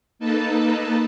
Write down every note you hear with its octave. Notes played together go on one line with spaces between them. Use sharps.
A#3 D#4 A4 B4 A5